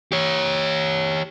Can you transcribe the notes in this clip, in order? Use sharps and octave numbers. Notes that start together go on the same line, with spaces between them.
G4 C#5